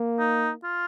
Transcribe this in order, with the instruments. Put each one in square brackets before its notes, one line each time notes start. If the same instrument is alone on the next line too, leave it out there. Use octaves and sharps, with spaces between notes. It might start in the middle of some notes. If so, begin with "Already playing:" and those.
Already playing: [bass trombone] A#3
[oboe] D#4
F4